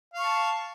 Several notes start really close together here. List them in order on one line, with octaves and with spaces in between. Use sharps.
F5 C#6 A5